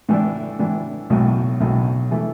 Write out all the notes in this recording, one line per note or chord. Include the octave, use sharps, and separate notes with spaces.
A2 E3 D4
A2 E3 D4
B1 A2 F#3
B1 A2 F#3
E3 A3